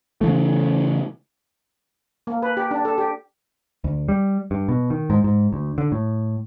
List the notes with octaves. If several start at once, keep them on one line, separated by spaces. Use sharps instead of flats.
C#3 E3 A3
A#3
B4
G4
D4
A4
G4
D2
G3
G2
B2
D#3
G#2
G#2
D2
D3
A2